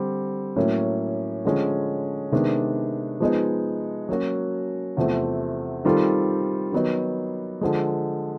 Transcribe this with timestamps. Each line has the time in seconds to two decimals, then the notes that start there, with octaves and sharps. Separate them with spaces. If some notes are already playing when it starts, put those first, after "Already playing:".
Already playing: D3 G3 C4
0.56 A2 F#3 A#3 C#4
1.45 D3 F3 G#3 C#4
2.32 C3 D#3 G#3 B3 D4
3.20 F3 G#3 B3 D#4
4.09 F#3 A#3 C#4 F#4
4.97 E2 C3 F3 A3 C4
5.85 D#3 G3 C4 F4 A4
6.72 D#3 F#3 B3 D#4
7.61 D3 F3 G#3